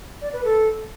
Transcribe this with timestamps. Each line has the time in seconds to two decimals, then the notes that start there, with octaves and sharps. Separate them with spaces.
0.21 D5
0.33 B4
0.45 A4